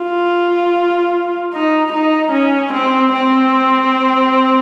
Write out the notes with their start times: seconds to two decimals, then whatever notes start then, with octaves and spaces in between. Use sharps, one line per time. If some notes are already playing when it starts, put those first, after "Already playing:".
Already playing: F4
1.53 D#4
1.92 D#4
2.32 C#4
2.73 C4
3.12 C4